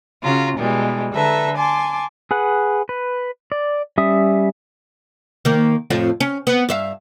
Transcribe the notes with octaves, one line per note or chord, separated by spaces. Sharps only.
C#3 F4 F#4 A#5
B2 E3 G3 G#3
D3 A4 B4 E5 A#5
G#5 A5 C6 D6
G#4 B4 F#5
B4
D5
G3 C#4 E5 D#6
D#3 A#3
F2 A2 F4
C#4
B3
G2 E5 F5